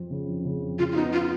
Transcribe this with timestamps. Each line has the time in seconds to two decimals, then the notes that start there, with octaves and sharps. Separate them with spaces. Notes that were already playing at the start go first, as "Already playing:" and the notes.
Already playing: F2 F3 F4
0.11 C#3
0.28 F2
0.45 C#3
0.62 F2
0.79 C#3 F4
0.92 F4
0.96 B3 D#4
1.13 B3 F4